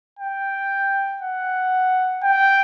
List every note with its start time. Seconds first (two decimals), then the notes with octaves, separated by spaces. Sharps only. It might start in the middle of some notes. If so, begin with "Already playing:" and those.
0.19 G5
1.22 F#5
2.23 G5